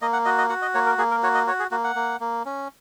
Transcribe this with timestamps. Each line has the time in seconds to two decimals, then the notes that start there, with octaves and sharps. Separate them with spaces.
0.02 A#3 D#5
0.13 F#5
0.25 F#4 D#5
0.38 D#5
0.50 F#4 F#5
0.62 D#5
0.74 A#3 C#5
0.86 A#4
0.98 A#3 G#4
1.11 A#4
1.23 F#4 C#5
1.35 D#5
1.47 F#4 C#5
1.59 G#4
1.71 A#3 F#4
1.84 F#5
1.95 A#3
2.20 A#3
2.45 C#4